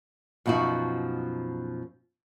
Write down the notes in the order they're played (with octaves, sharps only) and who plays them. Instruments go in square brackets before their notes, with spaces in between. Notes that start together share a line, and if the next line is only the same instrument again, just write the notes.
[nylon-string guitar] F#2 B2 F3 D#4 F#4